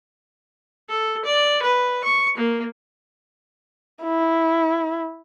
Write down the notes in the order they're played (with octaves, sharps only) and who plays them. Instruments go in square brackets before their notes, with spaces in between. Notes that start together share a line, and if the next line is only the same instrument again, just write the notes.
[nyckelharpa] A4
D5
B4
C#6
A#3
[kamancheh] E4